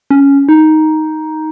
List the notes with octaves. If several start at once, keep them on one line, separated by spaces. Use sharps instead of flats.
C#4
D#4